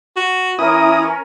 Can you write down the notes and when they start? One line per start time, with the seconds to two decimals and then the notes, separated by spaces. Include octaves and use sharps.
0.16 F#4
0.59 E3 C#4 E4 A#4 D#6